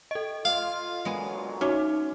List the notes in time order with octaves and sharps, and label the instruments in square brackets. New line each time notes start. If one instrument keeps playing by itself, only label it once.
[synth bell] A4 D#5
[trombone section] F4 [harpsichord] F5
[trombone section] A#2 D3 F#3 [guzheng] G#3 B3 G#4
[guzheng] C#4 [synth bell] D#4 F#4